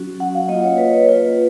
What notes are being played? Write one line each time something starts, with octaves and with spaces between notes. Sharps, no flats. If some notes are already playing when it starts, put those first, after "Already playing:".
Already playing: F#3 C#4 F#4
F#5
F5
A#3 F4 D#5
C#5
B4
C#5
A#3 F4 B4